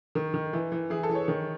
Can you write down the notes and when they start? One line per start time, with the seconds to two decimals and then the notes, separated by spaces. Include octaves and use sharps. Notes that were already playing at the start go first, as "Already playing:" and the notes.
0.15 D#3
0.34 D#3
0.53 E3
0.72 E3
0.90 E3 G#4
1.03 A4
1.09 E3
1.15 C#5
1.28 D#3